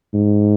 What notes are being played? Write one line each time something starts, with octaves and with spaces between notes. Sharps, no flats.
G#2